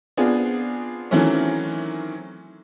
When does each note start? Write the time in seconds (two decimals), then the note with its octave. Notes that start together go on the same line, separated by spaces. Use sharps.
0.17 B3 C4 D4 F4 G#4
1.11 D#3 E3 F#3 A3 C4 C#4